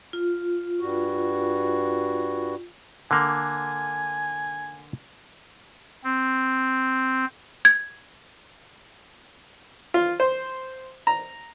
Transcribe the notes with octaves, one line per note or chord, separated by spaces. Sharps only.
F4
G2 F#4
D3 A#3 G#5
C4
G#6
F4
C5
A#5